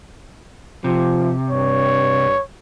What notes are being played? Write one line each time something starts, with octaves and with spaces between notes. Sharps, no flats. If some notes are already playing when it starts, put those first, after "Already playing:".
C3 F3
G2 C#5